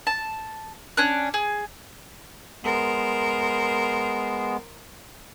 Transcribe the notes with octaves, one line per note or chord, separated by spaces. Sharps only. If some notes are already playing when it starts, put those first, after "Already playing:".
A5
C#4 D4 F#6
G#4
G#3 B3 A#4 C5